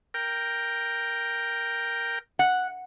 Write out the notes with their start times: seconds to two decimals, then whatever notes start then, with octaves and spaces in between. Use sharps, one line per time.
0.14 A#4 G5
2.39 F#5